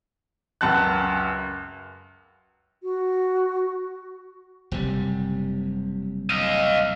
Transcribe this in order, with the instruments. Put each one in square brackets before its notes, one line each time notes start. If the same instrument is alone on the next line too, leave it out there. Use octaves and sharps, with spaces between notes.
[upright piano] C#2 F#2 F#5 A5 F#6
[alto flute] F#4
[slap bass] F#1 C3 G3
[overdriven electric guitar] D#5 F5